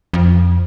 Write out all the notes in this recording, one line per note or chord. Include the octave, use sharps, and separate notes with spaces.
F2